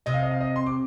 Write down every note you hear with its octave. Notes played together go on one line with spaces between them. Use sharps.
C3 D#5
F5
D#5
F5
D#5
C6
D6